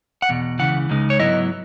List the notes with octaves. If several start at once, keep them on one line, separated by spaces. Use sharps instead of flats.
F#5
E2 B2
C#2 C#3 E3 F#5
C#2 C#3 G#3 D#4
C#5
G#2 F#3 B3 E4 D#5